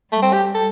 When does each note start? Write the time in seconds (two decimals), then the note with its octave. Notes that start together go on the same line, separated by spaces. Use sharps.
0.12 G3 A3
0.22 C4
0.33 G4
0.55 A4